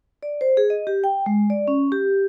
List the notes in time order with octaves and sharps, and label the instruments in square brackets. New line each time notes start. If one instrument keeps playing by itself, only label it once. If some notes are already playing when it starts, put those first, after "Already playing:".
[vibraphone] D5
C5
G#4
D#5
G4
G5
G#3
D5
C#4
G4